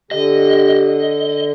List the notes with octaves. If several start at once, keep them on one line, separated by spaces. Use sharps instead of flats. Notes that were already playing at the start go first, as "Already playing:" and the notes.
D3 G4 D#5